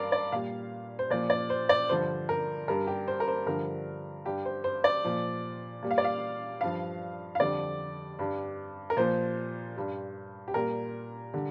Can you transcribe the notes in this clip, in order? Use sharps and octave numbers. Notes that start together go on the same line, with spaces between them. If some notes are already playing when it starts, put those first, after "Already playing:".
Already playing: G2 A#4 D5 F5
D5
A#2 G3 F5
C5
A#2 F3 D5
D5
C5
D5
G2 D3 F3 C5
A#4
G2 G3 A#4
G4
C5
A#4
C5
G2 D3 F3 A#4
G2 G3 G4
C5
C5
D5
A#2 F3
A#2 G3
F5
D5
F5
G2 F3 F5
F5
F2 D3 G3 D5
G2 G3
A#4
A#2 F3 C5
G2 G3
G4
A#2 G3 A#4
D3 G3